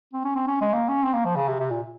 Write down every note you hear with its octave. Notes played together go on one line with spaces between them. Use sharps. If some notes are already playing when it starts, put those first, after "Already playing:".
C4
C#4
C4
C#4
G#3
A#3
C#4
C4
A#3
F3
C#3
C3
C3
A#2